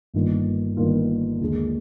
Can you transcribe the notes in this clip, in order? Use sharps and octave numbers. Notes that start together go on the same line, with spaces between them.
G1 G2 D#3 A#3 F4
G1 G2 D#3 A#3 F4
D#2 D3 G#3